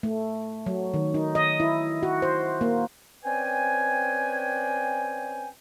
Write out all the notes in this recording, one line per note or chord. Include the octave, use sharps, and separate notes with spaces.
A3
F#3
D#3
D#4
D#5
E4
F#4
C5
A#3
C4 C#4 B4 D5 G5 G#5